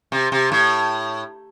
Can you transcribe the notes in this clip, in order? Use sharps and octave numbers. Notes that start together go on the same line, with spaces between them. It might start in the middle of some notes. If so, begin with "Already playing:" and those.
C3
C3
A2